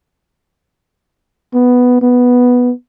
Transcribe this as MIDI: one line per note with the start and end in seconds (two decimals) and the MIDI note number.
1.54 2.01 59
2.02 2.71 59